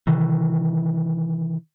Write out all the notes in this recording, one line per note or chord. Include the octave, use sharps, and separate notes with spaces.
C3 D#3 E3